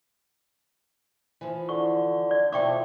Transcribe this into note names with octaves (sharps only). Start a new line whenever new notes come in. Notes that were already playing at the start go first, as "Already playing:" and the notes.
E3 F3
D3 C#6
D5
D#2 B2 F3 E4 G5 C#6 D6